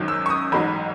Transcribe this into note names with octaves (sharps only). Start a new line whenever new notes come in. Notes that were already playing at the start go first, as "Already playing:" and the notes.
Already playing: G#1 F#2 D#3 F#3
E6
C#6
D#6
A1 G#2 F#3 B5